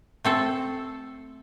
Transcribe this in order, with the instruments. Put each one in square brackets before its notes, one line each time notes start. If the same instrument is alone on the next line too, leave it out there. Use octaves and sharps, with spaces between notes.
[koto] A3 C4 A4